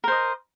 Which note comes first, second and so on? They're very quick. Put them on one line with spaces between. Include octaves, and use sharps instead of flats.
A#4 C5 D#5